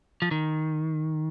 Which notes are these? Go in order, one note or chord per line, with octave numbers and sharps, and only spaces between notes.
F3
D#3